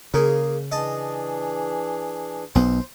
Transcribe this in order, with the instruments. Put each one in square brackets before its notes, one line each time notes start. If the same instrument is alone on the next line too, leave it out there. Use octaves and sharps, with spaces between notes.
[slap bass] C#3 [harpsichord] A#3 G#4
[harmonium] E3 D4 G#4 [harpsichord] D#5 A5
[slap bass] B1 B3 [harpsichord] C5